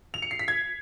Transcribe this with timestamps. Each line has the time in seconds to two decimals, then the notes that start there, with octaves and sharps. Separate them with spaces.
0.14 F7
0.22 C#7
0.31 C7
0.39 B6
0.48 G#6